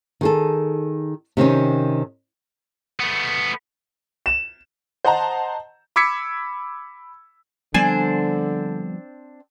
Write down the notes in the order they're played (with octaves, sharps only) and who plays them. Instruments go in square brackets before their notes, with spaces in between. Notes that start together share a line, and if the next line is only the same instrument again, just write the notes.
[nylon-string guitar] D#3 G#4 A4
C3 D#3 C4 C#4
[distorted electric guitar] A3 B3
[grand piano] E7
[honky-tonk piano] C5 D#5 F#5 A5 A#5
[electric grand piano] B5 D6 E6 G#6 B6 C#7
[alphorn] D3 [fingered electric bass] F3 G3 B3 [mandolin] C4 D4 C5 [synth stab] G#5